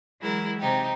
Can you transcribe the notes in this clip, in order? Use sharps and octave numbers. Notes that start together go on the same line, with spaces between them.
E3 F#3 G#3 E4 A#4
C3 D#4 G4